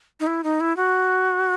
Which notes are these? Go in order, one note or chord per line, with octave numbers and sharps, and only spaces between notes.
D#4
E4
D#4
E4
F#4